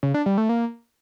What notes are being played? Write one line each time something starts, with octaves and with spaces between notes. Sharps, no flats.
C#3
D4
G3
A3
A#3